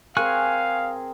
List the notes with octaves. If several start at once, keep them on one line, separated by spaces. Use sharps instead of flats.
C4 G#4 A#4 F5 G#5 C#6 F#6